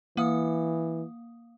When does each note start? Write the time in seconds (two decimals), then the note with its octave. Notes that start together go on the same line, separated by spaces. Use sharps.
0.17 E3 A#3 F5 D#6